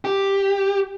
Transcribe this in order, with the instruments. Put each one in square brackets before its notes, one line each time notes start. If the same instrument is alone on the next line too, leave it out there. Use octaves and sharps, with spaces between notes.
[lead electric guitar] G4